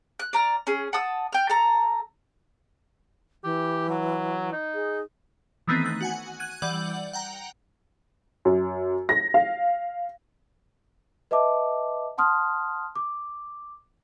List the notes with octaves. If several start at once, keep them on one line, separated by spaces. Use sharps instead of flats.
F#6
D5 A#5 F6
C#4 G#4
F#5 A5 D#6 E6
G5 F6
A4 A#5
E3 G4
F#3
D#4
G#4
D#3 E3 A3 B3 C4 D#4
F#6
F#4 F#5 G#5
F#6 G#6 D#7
E3 G3 D5 F#5 G6 F#7
F#5 G5 A#5
F#2
A#6
F5
B4 D#5 E5 A5 D6
F#5 A5 C6 D#6 F6
D6